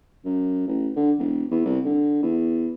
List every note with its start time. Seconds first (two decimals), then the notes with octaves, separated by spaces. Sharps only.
0.25 F#2
0.67 A1
0.96 D3
1.19 E1
1.51 E2
1.65 C2
1.85 D3
2.23 E2